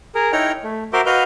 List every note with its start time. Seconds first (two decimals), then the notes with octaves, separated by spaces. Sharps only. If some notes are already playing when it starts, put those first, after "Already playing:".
0.15 G#4 A#4
0.32 D#4 E4 C#5 G5 A#5 F6
0.64 A3
0.93 F#4 A#4 C5 E5 C6 D6
1.06 F#4 B4 D#5 F5 F6 G6